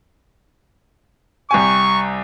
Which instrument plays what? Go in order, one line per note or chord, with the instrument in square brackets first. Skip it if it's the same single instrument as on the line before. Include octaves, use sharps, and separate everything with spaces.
[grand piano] C2 G4 G#5 [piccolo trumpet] C#6